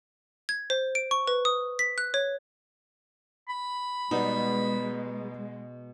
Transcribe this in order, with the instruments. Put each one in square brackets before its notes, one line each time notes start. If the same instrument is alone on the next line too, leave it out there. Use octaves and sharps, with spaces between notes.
[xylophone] G#6
C5
D7
C#6
B4
D#6
B6
F#6
C#5
[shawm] B5
[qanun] B2 [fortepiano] G3 B3 D#4 [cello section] G#3